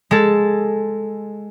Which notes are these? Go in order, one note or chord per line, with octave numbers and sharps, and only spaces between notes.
G#3 A4